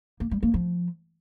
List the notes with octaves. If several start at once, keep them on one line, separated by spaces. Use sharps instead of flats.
A#3
G3
A#3
F3